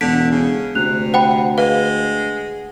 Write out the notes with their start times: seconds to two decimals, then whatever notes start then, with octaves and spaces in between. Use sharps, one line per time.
0.01 E1 D3 B6 D7
0.31 C#3
0.75 D2 C3 F#6 F7
1.14 C5 F#5 G5 B5
1.58 G#3 B4 F5